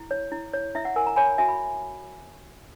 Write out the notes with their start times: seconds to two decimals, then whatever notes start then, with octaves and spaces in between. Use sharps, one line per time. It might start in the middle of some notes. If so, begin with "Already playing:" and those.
Already playing: E4
0.11 C#5
0.32 E4
0.54 C#5
0.75 E4 E5
0.85 F#5
0.96 A#4 G#5
1.07 A#5
1.16 C#5 G#5 B5
1.38 F#4 E5 G#5
1.49 B5